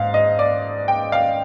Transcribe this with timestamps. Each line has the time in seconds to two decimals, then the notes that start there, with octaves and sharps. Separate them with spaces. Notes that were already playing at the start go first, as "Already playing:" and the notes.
Already playing: G#2 F5
0.14 D#5
0.39 D5
0.88 G5
1.12 F5